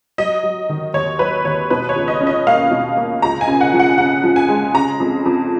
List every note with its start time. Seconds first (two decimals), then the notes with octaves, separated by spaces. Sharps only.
0.18 F#3 D#5
0.43 F#3
0.69 D#3
0.94 D#2 C#5
1.19 F#3 B4
1.45 D#2 C#5
1.70 B2 B4
1.89 C#5
1.96 C#2
2.08 D#5
2.21 C#4
2.27 D#5
2.47 A#3 F5
2.71 B2
2.97 A#3
3.22 C#2 A#5
3.41 G#5
3.48 C#3
3.61 F#5
3.73 F3
3.79 F#5
3.98 C#3 F#5
4.23 F3
4.36 G#5
4.49 G#3
4.74 C#3 A#5
5.00 F2
5.25 F2